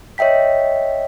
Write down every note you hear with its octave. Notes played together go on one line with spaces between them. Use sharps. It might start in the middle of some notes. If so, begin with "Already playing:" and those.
C#5 D#5 E5 G5 B6